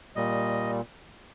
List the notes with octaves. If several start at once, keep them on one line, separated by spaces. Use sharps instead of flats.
A#2 G3 D#5